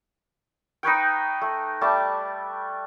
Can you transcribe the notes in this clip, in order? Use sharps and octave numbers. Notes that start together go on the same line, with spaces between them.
D#4 B4 C#5 G5
A3
G3 A3 A5 D6